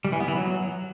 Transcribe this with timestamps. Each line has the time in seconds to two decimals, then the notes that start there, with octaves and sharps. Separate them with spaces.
0.05 G3
0.12 E3
0.20 B3
0.28 E3
0.36 F#3